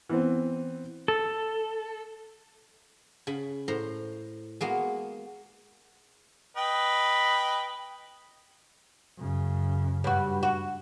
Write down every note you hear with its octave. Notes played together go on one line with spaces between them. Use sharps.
E3 B3 C4
A4
C#3 B5
A2 C5 A#5
G#3 A#3 B3 F#4
B4 D#5 G5
F#2 C#3
G2 F#4
F#4